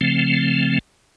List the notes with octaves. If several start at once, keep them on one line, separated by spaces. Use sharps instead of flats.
C#3 F3 A3 C4